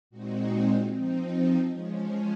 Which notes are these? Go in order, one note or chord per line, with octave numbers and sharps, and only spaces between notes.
A#2 G#3 C4 D#4 F#4
F3 C4 D#4
F3 G#3 C#4 G#4